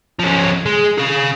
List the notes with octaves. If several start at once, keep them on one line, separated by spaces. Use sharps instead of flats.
F3 C#4
G#3
G#4 F5